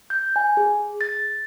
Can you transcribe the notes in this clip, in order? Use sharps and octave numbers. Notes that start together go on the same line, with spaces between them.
G6
G#5
G#4
A6